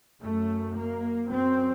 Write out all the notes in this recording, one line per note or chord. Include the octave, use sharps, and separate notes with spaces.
F#2 A3
A#3
F#2 C4